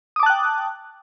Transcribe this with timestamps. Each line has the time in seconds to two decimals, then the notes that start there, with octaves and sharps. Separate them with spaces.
0.16 D#6
0.20 D6
0.23 A5
0.26 F#6
0.30 G5